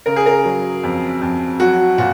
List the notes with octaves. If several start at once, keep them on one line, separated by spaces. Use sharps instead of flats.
C#3 A#4
G#4
A#4
F#3
F2
F2
F#3 F#4
A#2 F#4